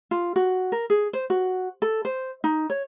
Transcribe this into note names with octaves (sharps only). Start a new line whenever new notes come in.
F4
F#4
A#4
G#4
C5
F#4
A4
C5
D#4
C#5